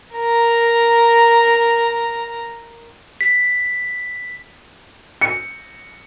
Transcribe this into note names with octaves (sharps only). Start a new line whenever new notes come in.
A#4 A#5
B6
C#7